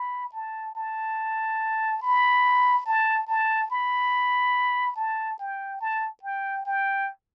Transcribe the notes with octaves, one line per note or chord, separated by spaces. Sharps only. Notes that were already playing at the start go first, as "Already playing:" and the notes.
Already playing: B5
A5
A5
B5
A5
A5
B5
A5
G5
A5
G5
G5